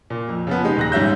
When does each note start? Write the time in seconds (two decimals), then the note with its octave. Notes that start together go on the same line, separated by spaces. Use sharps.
0.10 A#2
0.28 F2
0.47 C#3 F3 B3
0.65 G#3 D#4 G4
0.77 D#1 F#6 A#6
0.92 G#2 G3 C#4 E5 G6